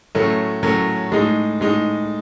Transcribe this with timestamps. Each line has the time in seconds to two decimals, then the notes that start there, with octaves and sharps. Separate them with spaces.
0.15 A2 F#3 A3 C#4
0.63 A2 F#3 A3 C#4
1.12 A2 G#3 D#4
1.61 A2 G#3 D#4